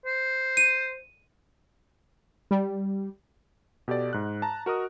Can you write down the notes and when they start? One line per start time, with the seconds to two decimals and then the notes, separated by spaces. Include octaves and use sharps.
0.06 C5
0.57 D#7
2.51 G3
3.88 B2 G4 A4 D5
4.13 G#2 F#6
4.42 A5 A#5
4.66 F#4 A#4 D#5 D#6